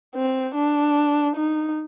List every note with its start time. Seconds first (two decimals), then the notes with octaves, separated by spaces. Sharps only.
0.15 C4
0.55 D4
1.36 D#4